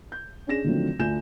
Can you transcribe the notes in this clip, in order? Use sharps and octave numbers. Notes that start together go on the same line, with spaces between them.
G6
C#4 D4 G#4 A#6 E7
D3 D#3 F3 F#3 A3 C4
D2 D4 F4 G#5 G6 E7